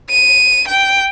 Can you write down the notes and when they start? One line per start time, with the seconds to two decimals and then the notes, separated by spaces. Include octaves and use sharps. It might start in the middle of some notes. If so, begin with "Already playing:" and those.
0.10 D#7
0.68 G5